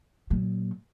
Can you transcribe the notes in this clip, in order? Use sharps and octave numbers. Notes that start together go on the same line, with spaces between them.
A#2 F#3